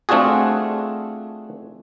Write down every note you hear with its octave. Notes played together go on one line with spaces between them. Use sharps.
A3 C4 D4 F4 F#4 G#4